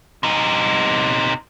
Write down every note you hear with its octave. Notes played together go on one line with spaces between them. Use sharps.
C3 D#4